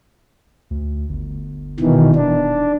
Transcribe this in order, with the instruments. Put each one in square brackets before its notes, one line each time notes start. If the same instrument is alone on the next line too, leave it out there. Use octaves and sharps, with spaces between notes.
[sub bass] D2
G1
[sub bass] D#1 [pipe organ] B2 D#3 E3
[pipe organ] D4